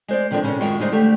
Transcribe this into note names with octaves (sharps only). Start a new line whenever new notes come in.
G#3 C5 D5
D3 D#3 F3 C#4 D4
A#2 C#3 G#3 C#4 F#4
F#2 D#3 G#3 F4 F#4
C#3 G3 G#3 D#4 C5
D3 A3 G4